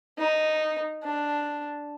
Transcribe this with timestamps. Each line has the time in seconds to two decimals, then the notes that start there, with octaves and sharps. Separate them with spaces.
0.19 D#4
1.04 D4